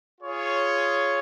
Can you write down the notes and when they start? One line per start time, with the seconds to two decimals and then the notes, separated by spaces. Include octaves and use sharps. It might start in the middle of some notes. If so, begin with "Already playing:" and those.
0.21 F4 G#4 C#5